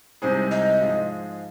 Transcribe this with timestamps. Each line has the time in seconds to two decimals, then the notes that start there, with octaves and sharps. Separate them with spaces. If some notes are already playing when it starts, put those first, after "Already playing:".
0.22 C2 C3 G#3 D#4 G#4 C5
0.51 D#5
0.81 G#2 F3 G#3 F4 G#4